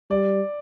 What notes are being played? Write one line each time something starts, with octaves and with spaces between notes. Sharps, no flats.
G3 D5